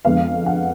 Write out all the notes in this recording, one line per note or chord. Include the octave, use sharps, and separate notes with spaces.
F2 D3 G#3 B3 F5
F#5